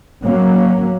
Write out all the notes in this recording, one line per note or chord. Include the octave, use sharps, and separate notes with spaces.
F#3 A#3 C#4